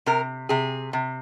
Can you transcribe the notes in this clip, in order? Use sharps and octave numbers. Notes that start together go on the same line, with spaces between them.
C3 A#4
C3 G#4
C3